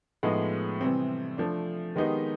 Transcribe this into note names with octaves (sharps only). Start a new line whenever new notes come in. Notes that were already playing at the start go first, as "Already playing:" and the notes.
A2 F3 G#3 B3 D#4
C3 E3 G3 C4
F3 A3 D4
D#3 G#3 B3 D#4 G4